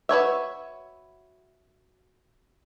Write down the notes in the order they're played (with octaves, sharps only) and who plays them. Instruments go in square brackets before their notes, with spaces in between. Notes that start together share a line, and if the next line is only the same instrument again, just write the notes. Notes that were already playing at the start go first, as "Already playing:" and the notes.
[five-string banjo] F#4 B4 C#5 E5